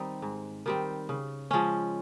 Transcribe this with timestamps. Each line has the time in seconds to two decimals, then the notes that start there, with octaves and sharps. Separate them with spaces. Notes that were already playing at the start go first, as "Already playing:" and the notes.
Already playing: D#3 G3 C4 D#4
0.22 G#2
0.66 D#3 G3 C4
1.09 C#3
1.51 F3 G#3 C#4